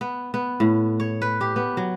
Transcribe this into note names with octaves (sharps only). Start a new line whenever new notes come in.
B3
B3
A2
C#5
B4
G4
B3
F#3